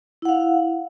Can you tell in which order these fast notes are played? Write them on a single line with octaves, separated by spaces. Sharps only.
E4 F#5 F5